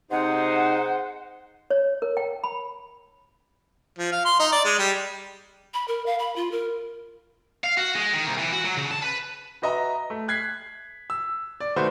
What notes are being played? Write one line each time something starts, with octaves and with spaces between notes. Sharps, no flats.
C3 D#4 G#4 C5 F#5
C#5
A#4
G5
B5
F3
F5
C6
D#4
D5
G#3
G3
B5
A#4
F5
B5
F4
A#4
F5
F#4
G#3
D#3
C2
E3
F#4
F#3
C#3
A5
B4
F#4 B4 D#5 E5 A#5
A3
F#6 G#6 B6 C7
E6
D5
D#3 A3 F#4 B4 C5